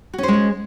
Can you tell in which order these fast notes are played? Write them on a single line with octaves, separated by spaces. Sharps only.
F#4 C#4 C5 G#3 G#4